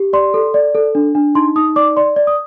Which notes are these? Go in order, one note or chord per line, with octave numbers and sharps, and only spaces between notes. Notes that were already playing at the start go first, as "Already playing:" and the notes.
Already playing: G4
D5 C6
A4
D5
A4
D4
D4
D#4 C6
D#4 D#6
D5 D6
D5 C6
D5
D#6